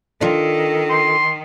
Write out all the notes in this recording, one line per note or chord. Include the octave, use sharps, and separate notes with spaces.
D#3 D4 F4 A4
C6